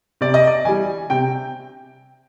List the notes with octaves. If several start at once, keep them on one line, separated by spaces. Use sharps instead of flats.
C3 D5
D#5
D5
E3 G3 G#5
C3 G5